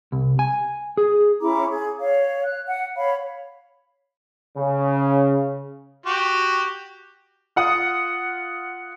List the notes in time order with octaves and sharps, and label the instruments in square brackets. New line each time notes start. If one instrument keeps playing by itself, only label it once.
[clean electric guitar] C2
G#5
G#4
[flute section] C#4 E4 A#5 D6
G#4
C#5 F5
F#6
F#5
C#5 F5 B5
[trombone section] C#3
[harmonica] F#4 G4
[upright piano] F4 F#5 D#6